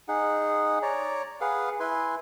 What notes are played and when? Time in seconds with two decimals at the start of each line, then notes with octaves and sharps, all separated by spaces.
0.08 D#4 G#4 F#5
0.82 C#5 D5 A#5
1.41 G#4 B4 F5 F#5
1.80 E4 B4 G#5 C6